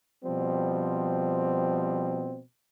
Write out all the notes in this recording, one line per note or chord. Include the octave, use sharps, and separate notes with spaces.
B2 F3 G3 C4